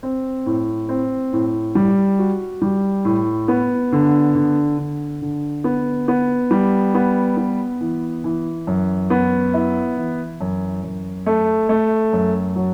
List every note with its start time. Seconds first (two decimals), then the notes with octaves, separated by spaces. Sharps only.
0.03 C4
0.46 A2
0.89 C4
1.33 A2
1.75 G3
2.19 F#4
2.62 G3
3.05 A2
3.48 B3
3.92 D3
4.35 D3
4.78 D3
5.22 D3
5.64 B3
6.08 B3
6.51 G3
6.94 B3
7.37 B3
7.81 E3
8.24 E3
8.67 F#2
9.10 B3
9.54 E4
9.97 E3
10.41 F#2
10.83 F#2
11.26 A3
11.69 A3
12.13 F#2
12.56 F#3